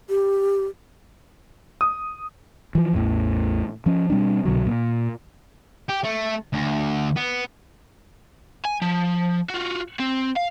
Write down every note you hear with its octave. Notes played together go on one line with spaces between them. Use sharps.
G4
D#6
E3 F3
A1 E2 A2
F3 C#4
B2 G3 C4 D4
C2 B2 D3 F#3
A#2
G4
A3
D2
B3
G#5
F3
F4 F#4
C4
F5